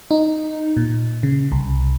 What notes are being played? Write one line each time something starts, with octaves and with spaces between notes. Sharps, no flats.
D#4
A#2
C#3
C2